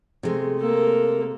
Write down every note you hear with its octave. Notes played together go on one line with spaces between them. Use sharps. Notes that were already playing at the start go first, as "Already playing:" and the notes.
C3 G#3 A3
A#3 A4